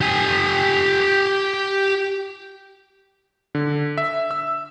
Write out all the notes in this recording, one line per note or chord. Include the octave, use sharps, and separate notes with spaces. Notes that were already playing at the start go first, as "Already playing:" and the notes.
G4 G#5
D3
E5
E6